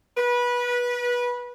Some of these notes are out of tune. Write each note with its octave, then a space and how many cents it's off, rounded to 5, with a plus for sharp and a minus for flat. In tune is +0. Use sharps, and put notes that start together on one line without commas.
B4 -20